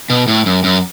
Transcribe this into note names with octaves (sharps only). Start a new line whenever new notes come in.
B2
A2
F#2
F#2